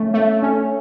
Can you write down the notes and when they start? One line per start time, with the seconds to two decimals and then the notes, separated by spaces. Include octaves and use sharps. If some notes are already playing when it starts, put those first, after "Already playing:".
Already playing: A3 C#4
0.14 A3
0.43 C#4